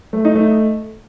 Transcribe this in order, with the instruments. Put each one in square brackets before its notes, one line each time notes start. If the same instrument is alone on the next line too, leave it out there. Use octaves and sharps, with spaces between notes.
[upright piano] A3
D#4
A3